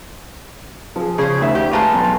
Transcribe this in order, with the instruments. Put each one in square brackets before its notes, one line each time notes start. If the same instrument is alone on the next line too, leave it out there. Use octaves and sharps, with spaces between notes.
[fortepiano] F3 G#4
[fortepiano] C#3 [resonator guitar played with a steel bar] G#4 C5
[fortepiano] D2 D#3 E5
[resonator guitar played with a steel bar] G4
[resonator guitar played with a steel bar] G#3 A3 B4 [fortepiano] F5 A#5 F6
[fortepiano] B1